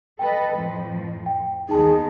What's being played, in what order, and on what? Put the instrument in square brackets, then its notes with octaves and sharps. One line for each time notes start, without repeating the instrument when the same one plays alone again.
[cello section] A4 B4 D#5 [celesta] G5
[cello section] F2 A2 F3
[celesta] G5
[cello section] D#2 D#3 B3 [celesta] D#4 A5 [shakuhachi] G#4